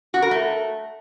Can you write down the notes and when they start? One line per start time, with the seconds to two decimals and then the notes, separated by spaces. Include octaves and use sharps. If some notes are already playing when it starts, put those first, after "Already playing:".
0.14 F#4
0.22 A#4
0.31 A3